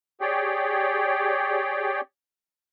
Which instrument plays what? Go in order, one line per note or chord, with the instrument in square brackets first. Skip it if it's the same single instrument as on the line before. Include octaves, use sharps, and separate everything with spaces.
[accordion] G4 G#4 C#5 D5 G5